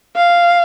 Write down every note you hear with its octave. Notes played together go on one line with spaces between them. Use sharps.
F5